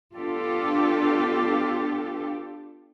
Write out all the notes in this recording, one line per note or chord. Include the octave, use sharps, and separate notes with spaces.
B3 D4 F4 G4 A4